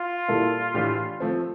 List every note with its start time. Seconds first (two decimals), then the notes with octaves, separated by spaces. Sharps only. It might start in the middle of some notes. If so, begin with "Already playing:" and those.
Already playing: F4
0.28 A#2 G3 A#3 E4 A4
0.74 A2 E3 A3 D4 G4
1.20 F3 A3 C4